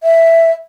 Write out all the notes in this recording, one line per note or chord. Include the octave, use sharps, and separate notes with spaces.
E5